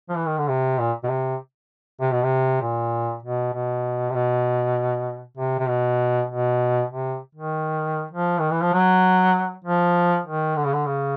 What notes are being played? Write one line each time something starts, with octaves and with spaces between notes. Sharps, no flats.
F3
E3
D#3
D3
C3
A#2
B2
C3
C3
B2
C3
A#2
B2
B2
C3
B2
C3
C3
B2
B2
C3
D#3
F3
D#3
E3
F3
F#3
F3
D#3
D3
C#3
D3
C#3